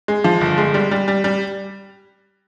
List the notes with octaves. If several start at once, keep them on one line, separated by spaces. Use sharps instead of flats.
G#3
F3
G1
G#3
G3
G3
G3
G3